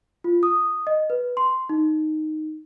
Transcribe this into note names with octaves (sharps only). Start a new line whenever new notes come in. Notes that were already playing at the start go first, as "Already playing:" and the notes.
F4
D#6
D#5
B4
C6
D#4